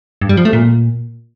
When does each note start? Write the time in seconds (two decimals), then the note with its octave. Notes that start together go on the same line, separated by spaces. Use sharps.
0.22 G2
0.29 G3
0.37 F3
0.45 A3
0.53 A#2